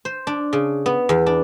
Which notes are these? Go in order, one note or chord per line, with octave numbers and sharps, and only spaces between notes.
C5
D4
C#3
B3
E2
D4